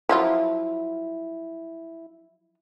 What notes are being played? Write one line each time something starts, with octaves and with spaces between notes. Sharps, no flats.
F3 F#3 E4 F4